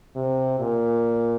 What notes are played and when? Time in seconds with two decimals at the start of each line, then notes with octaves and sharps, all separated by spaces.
0.15 C3
0.60 A#2